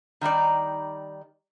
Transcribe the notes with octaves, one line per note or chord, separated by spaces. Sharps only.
D#3 G3 D#4 D5